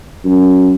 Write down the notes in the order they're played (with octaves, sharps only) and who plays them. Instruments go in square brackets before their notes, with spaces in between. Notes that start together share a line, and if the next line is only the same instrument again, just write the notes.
[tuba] F#2